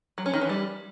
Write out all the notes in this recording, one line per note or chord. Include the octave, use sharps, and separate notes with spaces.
F#3
C#4
D#3
E3
G3